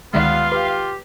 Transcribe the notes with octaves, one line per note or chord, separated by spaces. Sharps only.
D2 D#3 G3 G#3 B3 F4 F5
G4 B4